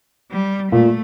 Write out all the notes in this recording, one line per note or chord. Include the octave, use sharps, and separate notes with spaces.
G3
A#2 A3